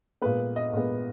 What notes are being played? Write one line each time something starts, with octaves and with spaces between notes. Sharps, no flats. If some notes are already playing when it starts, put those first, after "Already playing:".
A#2 G#3 B3 B4
D#5
A#2 G#3 B3